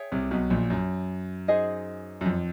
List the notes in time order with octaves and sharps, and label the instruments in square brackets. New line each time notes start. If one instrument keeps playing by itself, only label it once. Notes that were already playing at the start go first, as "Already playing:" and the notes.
Already playing: [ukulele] G#4 C#5 E5 G5
[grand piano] C2 C3
B1 B2
A#1 A#2
F#2
[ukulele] D#4 G#4 C5 D#5
[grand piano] F#2
F2